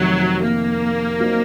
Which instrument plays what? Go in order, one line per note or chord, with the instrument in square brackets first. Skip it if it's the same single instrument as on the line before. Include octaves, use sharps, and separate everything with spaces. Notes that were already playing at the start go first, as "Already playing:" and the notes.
Already playing: [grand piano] F2 C3 D#3 A3 [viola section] F#3
[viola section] A#3
[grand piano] F#3 C4 D#4